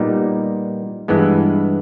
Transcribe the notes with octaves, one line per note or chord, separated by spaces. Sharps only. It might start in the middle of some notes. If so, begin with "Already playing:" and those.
Already playing: A#2 G3 B3 D#4
G2 E3 G#3 B3